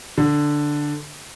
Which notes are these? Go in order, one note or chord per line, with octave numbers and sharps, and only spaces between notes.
D3